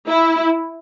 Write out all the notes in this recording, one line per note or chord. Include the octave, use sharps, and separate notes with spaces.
E4